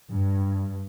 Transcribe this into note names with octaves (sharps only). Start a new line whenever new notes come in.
G2